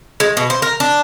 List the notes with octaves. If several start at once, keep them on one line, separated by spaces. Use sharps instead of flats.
G#3
B2
C5
A#4
D4